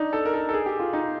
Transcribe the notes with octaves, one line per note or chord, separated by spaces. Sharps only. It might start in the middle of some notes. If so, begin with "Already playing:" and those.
Already playing: D4 D#4
A4
A#4
A4
A4
G#4
G4
F4
D#4